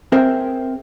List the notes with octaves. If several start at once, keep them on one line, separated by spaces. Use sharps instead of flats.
C4 G#4 A#4 C5 E5